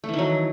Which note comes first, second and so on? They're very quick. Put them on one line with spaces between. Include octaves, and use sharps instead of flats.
A3 E3 D#3 F#3